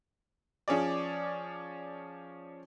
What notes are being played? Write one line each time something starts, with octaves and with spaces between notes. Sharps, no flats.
F3 C#4 G#4 D5